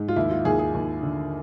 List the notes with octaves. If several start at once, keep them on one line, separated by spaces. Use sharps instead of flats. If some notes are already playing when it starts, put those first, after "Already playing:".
Already playing: G#2
F4
D#2 E4
F4
D#2 G#4
G#4
D#2
D3